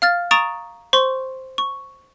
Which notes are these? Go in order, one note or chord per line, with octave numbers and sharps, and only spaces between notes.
F5 F6 A6
A#5 C#6 D#6 A6 D7 E7
C5 C6 C#6
C#6